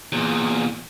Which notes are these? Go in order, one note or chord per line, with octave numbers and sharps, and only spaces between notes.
E2 A#2